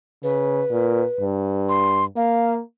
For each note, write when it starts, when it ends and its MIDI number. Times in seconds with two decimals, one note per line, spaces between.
0.23 0.62 49
0.23 1.25 71
0.71 1.02 46
1.21 2.06 43
1.69 2.05 84
2.16 2.60 58
2.16 2.54 77